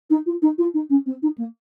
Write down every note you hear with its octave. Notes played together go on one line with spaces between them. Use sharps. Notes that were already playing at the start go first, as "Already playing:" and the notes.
D#4
F4
D#4
F4
D#4
C#4
C4
D#4
A#3